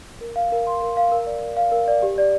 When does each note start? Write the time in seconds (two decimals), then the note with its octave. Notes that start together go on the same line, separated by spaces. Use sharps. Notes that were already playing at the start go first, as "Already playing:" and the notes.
0.21 A#4
0.36 F5
0.52 A#4
0.67 C6
0.82 A#4
0.97 F5
1.12 A#4
1.26 D5
1.42 A#4
1.57 F5
1.72 A#4
1.88 D5
2.03 G4
2.18 D5